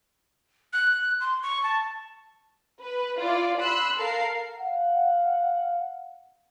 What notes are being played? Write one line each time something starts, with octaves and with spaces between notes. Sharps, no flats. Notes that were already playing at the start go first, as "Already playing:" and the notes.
F#6
C6
C#6
A5
B4
E4 F4 D5
B5 C6 E6 F#6
A4 A#4 F5 C7
F5 F#5